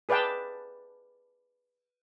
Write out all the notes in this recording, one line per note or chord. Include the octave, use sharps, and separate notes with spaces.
G#4 B4 D5 F5 G5 A5